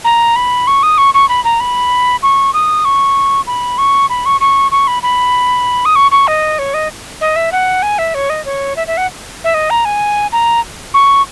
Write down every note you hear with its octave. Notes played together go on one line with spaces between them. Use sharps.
A#5
B5
C#6
D#6
C#6
C#6
B5
A#5
B5
C#6
D#6
C#6
B5
C#6
B5
C#6
C#6
C#6
B5
B5
D#6
C#6
C#6
D#5
C#5
D#5
D#5
E5
F#5
G#5
E5
C#5
D#5
C#5
E5
E5
F#5
E5
D#5
A#5
G#5
A#5
C#6